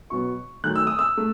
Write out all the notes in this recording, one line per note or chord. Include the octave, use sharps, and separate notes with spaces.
B2 F#3 B3 C#6
D#3 F#3 A3 F#6
E6
D#6
E6
A3